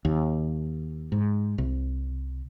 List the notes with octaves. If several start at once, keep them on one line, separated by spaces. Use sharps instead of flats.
D#2
G#2
C2